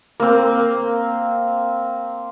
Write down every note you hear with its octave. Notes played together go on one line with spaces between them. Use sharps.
A#3 C4